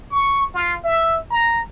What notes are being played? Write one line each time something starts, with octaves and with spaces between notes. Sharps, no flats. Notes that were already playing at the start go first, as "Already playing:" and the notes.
C#6
F4
E5
A#5